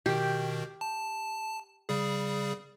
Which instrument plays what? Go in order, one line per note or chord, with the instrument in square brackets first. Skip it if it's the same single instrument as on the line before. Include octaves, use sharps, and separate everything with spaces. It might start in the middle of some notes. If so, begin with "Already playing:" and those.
[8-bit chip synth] B2 D#3 [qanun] G4
[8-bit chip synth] A5
C#3 G3 G#4